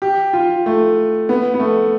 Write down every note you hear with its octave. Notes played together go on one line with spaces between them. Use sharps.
G4
F4
A3
B3
B3
A3